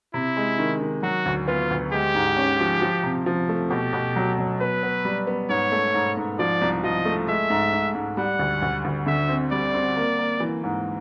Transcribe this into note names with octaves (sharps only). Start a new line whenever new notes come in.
C3 E4
G#3
D#3
D#3
F#3 F#4
D2
B3 F4
D2
G#3 G4
G#2
C#4
F3
F3
C3
F3
A3
B2 G4
B2
F#3
F#3
B3 B4
B3
G3
B3
G#2 C#5
A3
G#2
G#2
F3 D5
C2
F3 D#5
A3
G#3 E5
G#2
G#2
G#2
G3 F#5
D2
D2
D2
D3 E5
C4
G3 D5
C4
A#3
A#3
E3
G#2